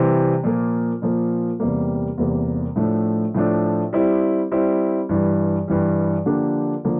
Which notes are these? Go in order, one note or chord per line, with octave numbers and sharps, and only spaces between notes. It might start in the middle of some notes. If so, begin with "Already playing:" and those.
Already playing: C3 E3 G3 C4
A#2 F3 A#3
A#2 F3 A#3
E2 C3 G3 A#3
E2 C3 G3 A#3
A2 F3 A3 D4
A2 F3 A3 D4
G3 C4 E4
G3 C4 E4
G2 E3 G3
G2 E3 G3
D3 F3 A#3 D4 G4
D3 F3 A#3